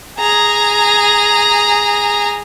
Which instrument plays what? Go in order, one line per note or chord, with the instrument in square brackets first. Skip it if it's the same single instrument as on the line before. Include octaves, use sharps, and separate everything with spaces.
[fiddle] G#4 A#5